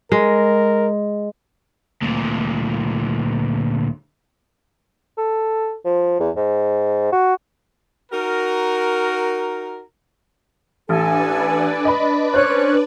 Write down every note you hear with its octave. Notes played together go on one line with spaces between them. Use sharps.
G#3 A#4
D2 A#2
A4
F3
E2
G#2
F#4
D#4 F#4 A#4
A1 D4 A4 B4 D5 G#5
D#5 B5
C#4 C5 C#5 F#6